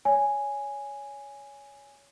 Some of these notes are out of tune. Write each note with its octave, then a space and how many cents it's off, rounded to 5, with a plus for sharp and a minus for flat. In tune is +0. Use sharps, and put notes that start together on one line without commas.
C#5 +20 G#5 +0